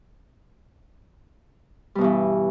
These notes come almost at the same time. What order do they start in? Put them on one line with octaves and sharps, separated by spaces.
G3 B2 G2 E3